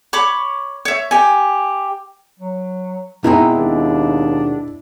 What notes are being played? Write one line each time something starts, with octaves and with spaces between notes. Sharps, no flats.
C#5 B5 C#6 D6
C#5 E5
G4 G#5
F#3
B2 G#3 C4 D#4 E4
D#2 D4